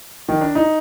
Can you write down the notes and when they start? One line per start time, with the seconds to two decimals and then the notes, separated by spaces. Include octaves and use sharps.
0.29 D#3
0.41 D4
0.55 D#4